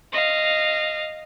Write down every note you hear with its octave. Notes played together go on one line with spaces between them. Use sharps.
D#5 F5